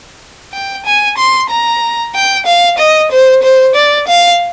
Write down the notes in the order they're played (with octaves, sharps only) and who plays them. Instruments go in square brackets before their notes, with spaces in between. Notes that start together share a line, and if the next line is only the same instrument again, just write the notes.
[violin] G5
G#5
C6
A#5
G5
F5
D#5
C5
C5
D5
F5